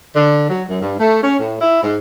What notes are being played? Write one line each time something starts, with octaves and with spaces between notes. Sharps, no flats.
D3
F#3
F#2
G2
A3
C#4
A2
E4
G#2